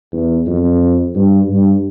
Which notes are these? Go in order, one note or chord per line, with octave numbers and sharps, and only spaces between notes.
E2
F2
G2
G2